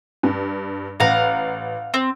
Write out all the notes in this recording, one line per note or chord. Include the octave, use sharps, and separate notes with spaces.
G2
A1 F5 F#5 A#5
C4